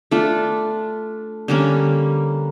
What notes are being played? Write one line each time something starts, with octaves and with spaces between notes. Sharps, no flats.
A3 D4 F4
D3 G3 A#3 C#4